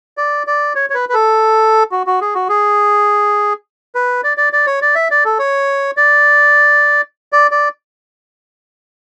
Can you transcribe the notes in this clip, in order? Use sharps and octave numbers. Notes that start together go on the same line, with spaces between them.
D5
D5
C#5
C#5
B4
B4
A4
F#4
F#4
G#4
F#4
G#4
B4
D5
D5
D5
C#5
D5
E5
D5
A4
C#5
D5
D5
D5